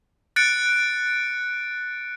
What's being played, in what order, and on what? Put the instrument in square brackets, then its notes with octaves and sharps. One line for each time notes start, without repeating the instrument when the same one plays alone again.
[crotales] F#6 A6 C#7 D7